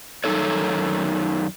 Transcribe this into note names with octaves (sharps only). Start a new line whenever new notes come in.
F#2 D#3 E3 D#4 A4 C#5